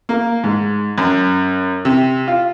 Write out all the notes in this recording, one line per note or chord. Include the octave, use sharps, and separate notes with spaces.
A#3
G#2
F#2
C3
F4